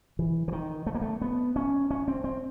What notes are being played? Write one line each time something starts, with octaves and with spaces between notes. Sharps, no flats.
E3
E3
D#3
A3
A#3
A3
B3
C#4
C#4
C4
C4